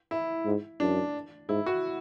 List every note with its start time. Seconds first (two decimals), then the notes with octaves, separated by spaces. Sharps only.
0.11 E4
0.45 G#2
0.80 F#2 D4
1.49 G#2 E4
1.66 F#4